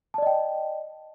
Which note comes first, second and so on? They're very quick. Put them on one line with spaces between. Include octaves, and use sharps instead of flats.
A5 D5 D#5 G5